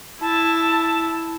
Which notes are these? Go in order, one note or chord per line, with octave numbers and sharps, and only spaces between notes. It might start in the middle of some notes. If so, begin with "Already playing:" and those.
E4 A5